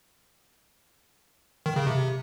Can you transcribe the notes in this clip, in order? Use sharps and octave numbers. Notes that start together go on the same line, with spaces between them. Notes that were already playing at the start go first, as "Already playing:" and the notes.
D#3
C#3
C3